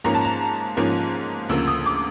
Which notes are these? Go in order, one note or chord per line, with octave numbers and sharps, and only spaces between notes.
G#2 F3 A#3 C#4 A#5
A5
A#5
G#2 F3 A#3 C#4
D2 C#3 F3 A#3 E6
D#6
D6